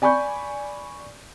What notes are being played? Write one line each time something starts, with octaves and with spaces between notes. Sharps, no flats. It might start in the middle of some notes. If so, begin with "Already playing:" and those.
D5 G#5 B5 C#6 G6